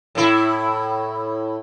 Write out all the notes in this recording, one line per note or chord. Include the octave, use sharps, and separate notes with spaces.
A2 E4